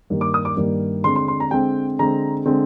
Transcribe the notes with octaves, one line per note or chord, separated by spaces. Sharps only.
G2 D#3 G3 A#3
D6
D#6
D6
G2 D#3 G3 A#3
D3 G#3 C4 C6
C6
C6
A#5
D3 G#3 C4 G5
D3 G#3 C4 A#5
D3 G#3 C4